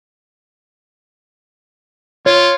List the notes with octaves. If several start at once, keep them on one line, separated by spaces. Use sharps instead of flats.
F4 C#5